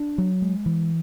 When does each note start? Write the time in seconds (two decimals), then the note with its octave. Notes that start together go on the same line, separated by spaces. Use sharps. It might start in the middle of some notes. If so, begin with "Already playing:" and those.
Already playing: D4
0.18 F#3
0.42 G#3
0.66 E3